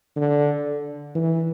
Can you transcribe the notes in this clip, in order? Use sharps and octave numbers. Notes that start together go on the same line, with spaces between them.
D3
E3